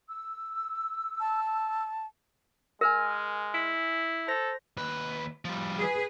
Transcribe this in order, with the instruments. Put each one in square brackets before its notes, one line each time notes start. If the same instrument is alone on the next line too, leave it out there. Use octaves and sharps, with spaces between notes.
[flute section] E6
[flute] A5
[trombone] G#3 [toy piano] A#4 [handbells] G#5 F6 A#6
[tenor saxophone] E4
[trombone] A4 [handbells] C5 A#6
[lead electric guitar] D#2 B4
F3 G3
[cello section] G#4 B4